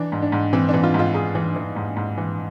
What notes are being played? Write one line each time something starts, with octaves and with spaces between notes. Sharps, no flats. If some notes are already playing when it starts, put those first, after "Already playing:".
Already playing: E3 D4
G#2
D4
G#2
E3 C4
D4
E3
F4
G#2 F4
G#2 G#4
E3
E3
G#2
G#2
E3